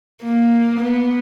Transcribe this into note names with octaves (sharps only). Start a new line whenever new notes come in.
A#3
B3